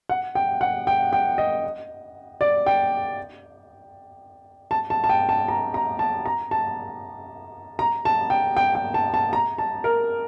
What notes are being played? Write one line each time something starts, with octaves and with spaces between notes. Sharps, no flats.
F#5
G5
F#5
G5
G5
D#5
D5
G5
A5
A5
A5
G5
A5
A#5
A#5
A5
A#5
A5
A#5
A5
G5
G5
G5
A5
A5
A#5
A5
A#4